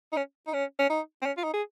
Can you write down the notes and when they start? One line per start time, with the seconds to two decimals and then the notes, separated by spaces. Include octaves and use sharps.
0.12 D#4
0.16 C#4
0.47 D#4
0.53 C#4
0.79 C#4
0.90 D#4
1.22 C4
1.26 C#4
1.37 F4
1.44 D#4
1.53 G#4